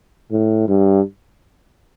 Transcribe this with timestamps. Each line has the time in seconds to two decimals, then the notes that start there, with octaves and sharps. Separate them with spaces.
0.32 A2
0.68 G2